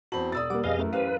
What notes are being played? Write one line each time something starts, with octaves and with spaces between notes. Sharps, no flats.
E2 C4 F#4 A5 B5 F#7
E1 D5 D#6 E6 A6
G3 A#3 F#5 D6
F2 G4 G#4 B4 D#5 F5
F#2 E3 A3 A#4
C#4 G4 B4 C5 F5